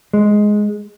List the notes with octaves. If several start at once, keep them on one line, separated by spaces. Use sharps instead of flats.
G#3